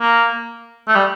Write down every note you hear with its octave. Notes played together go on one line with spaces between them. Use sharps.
A#3
A3
G3